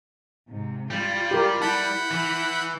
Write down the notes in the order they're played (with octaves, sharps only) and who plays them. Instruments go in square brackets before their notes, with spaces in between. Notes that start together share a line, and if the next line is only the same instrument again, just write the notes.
[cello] G#2 C3
[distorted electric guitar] G3 [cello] F4
[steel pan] G4 A#4
[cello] E4 [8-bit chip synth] F#5 B5 G6 [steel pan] A5
[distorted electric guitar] E3